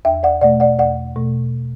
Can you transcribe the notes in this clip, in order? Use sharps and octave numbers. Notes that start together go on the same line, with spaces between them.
E2 E5 G5
D5 F#5
B2 A3 D5 F#5
D5 F#5
E2 D5 F#5
B2 A3